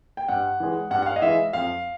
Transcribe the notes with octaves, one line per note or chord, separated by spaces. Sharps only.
G5
G2 F#5
E3 G#3
G2 F#5
F#5
F5
D#5
E3 G#3 E5
F2 F5